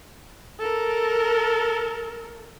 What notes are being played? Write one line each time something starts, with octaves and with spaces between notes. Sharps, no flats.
A4 A#4